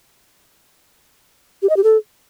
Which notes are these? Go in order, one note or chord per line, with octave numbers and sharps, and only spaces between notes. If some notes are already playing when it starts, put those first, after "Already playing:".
G4
D#5
G4
A4